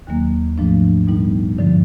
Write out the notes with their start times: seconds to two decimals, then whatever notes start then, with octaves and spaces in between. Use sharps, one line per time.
0.07 D#2 D#3 F#3 A#3
0.58 G#2 F3 A3 D4
1.08 A#2 G3 B3 D#4
1.56 G2 D3 F3 G#3